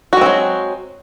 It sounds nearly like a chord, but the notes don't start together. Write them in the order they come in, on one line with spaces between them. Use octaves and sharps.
F#4 G#3 C4 F#3